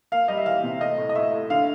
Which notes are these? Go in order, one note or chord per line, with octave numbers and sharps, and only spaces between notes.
A#3 F5
G3 D#5
E5
E3 F5
C3
A3 D#5
A2
D#5
A2 E5
A2
D3 F5